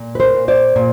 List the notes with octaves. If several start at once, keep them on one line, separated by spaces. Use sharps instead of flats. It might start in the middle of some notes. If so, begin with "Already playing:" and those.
Already playing: A#2
B4
A#4 C5
A#2
C5 D5
A#2